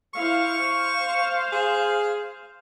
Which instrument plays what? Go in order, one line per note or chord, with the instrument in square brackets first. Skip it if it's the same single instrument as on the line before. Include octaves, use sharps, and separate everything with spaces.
[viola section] E4 C5 F5 [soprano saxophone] C#6
[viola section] C5 F5
[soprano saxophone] G#4